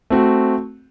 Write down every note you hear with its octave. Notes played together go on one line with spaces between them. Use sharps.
A3 C4 F#4